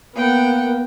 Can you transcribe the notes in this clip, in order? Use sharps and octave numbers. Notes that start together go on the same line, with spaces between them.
A#3 B3 F#5 G5